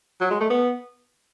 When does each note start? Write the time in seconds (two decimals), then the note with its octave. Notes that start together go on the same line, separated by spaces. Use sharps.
0.21 F#3
0.31 G#3
0.40 A3
0.50 B3